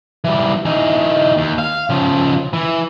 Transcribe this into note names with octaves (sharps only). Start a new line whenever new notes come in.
E3 G3
E3 D#4
D#2
F5
C#3 F3
E3